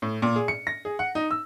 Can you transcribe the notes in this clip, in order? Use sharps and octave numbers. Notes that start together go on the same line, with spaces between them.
A2
A#2
G#4
C#7
A#6
G#4
F#5
D#4
E6